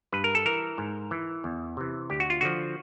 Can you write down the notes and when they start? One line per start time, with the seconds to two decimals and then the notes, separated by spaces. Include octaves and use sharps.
0.12 G2 B4
0.24 A#4
0.35 A4
0.46 E3 A#4
0.78 G#2
1.11 E3
1.44 E2
1.77 C3 E3
2.10 D2 G4
2.20 F#4
2.30 F4
2.41 D3 F3 F#4